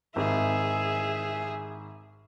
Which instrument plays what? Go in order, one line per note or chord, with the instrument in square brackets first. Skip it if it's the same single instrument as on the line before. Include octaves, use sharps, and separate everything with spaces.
[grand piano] G#1 [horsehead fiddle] G#4 E5